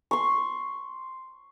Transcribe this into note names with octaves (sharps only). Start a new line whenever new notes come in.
C6 C#6